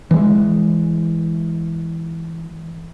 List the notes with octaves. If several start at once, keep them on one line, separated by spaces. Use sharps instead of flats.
E3 G#3